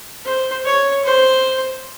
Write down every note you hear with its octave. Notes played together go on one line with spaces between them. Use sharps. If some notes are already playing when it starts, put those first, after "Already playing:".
C5
C#5
C5